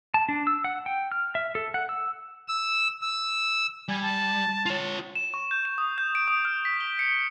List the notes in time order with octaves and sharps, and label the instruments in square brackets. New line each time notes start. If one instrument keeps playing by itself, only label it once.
[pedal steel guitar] A5
D4
E6
F#5
G5
F6
E5
A4
F#5
E6
[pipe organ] E6
E6
[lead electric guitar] G3 [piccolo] G#5
[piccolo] A5
[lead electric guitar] F4 C#5
[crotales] E7
C#6
G6
E7
D#6
G6
D7
D#6
F6
B6
G7
C#7